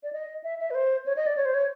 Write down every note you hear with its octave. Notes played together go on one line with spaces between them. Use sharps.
D5
D#5
E5
E5
B4
C5
C#5
D#5
D5
C#5
C5
C#5